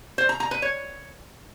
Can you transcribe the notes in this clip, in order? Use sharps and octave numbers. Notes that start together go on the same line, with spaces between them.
C5
A#5
A#5
B4
C#5